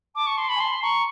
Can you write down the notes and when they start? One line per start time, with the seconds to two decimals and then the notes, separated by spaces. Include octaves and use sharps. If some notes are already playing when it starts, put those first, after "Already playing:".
0.15 A5 D6
0.27 C#6
0.38 C6
0.49 B5
0.55 G#5
0.60 A5 C6
0.82 A#5 C#6